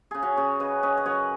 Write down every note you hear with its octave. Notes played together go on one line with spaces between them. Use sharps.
C#3 G#4
C#4 F#4
C#3 G#4 C#5
C#3 B4 D#5
C#4 B4 D#5
D#5
F#2 C#5 F#5